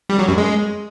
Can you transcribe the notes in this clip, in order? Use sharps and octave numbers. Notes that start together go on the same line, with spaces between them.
G3
F#3
F#2
G#3